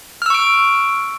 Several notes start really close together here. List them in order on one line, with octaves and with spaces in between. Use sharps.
F6 E6 C#6 D7